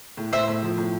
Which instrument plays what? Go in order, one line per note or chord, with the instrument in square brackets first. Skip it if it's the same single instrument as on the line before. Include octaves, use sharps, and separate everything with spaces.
[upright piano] A2
[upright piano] A2 [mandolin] C5 E5
[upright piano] A2
F3
A2